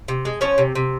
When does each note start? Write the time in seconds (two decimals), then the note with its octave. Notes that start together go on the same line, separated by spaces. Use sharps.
0.08 C3
0.25 G#3
0.41 F3 C#4 C#5
0.58 C3
0.75 C3